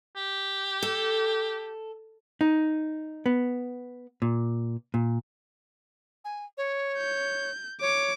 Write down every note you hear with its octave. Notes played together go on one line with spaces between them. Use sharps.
G4
A4
D#4
B3
A#2
A#2
G#5
C#5
G6
C#5 D6